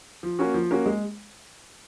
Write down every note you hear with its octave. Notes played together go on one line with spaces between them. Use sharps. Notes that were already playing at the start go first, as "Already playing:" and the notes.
F3
A#3 C#4 F#4
F3
A#3 C#4 F#4
G#3